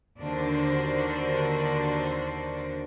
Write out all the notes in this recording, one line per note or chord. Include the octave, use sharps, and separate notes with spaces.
D#2 D3 D4 F#4 A#4 C5